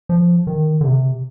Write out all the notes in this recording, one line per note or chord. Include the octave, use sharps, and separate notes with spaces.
F3
D#3
D3
C3